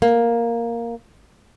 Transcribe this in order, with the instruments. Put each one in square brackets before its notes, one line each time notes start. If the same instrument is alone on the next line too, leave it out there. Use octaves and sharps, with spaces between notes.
[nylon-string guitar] A#3